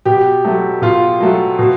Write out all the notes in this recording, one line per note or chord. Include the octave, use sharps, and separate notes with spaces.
B2 G4
F#3 A3
B2 F4
F#3 A3
B2